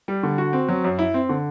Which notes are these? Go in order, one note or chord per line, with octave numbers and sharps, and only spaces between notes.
G3
D3
F#4
C4
F#3
F#2
E4
C4
D3